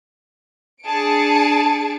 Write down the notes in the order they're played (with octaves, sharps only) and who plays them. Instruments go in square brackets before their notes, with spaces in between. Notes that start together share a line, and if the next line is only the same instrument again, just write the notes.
[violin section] D4 G#4 A5 C#7 D7